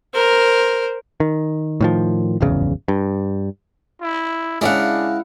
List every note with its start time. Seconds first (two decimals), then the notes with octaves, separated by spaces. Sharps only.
0.14 A#4 C5
1.20 D#3
1.81 A2 D#3 F3
2.40 D1 G#1 E2 C#3
2.88 G2
4.01 E4
4.61 C#3 G#3 D4 E4 F5 F#5